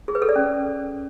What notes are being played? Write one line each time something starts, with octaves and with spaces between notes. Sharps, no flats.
G#4
B4
A4
D5
C#4